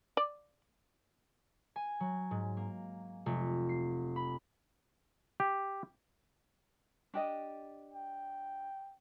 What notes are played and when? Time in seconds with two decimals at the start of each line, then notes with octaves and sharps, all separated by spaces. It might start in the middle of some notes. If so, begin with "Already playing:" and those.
0.17 D5
1.76 G#5
2.00 F#3
2.31 G#2
2.57 A#3
3.26 F1
3.69 C7
4.16 B5
5.40 G4
7.14 D4 G4 D#5
7.94 G5